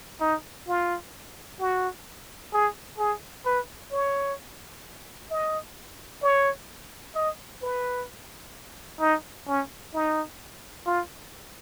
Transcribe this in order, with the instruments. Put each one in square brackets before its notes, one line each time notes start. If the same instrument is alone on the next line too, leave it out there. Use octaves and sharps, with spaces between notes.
[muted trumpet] D#4
F4
F#4
G#4
G#4
B4
C#5
D#5
C#5
D#5
B4
D#4
C#4
D#4
F4